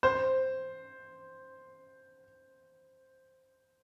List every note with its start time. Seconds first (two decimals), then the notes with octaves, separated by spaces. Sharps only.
0.03 C5